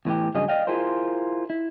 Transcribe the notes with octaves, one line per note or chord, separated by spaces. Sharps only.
E2 A2 E3 G4
G2 C#3 F#3 C#4 G#4 D#5
D5 D#5 F5 G5
E4 F4 G#4 A#4 C5
E4